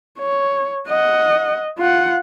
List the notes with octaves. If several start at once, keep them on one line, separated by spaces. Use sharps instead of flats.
C#5
D#5 F#5
F4 F#5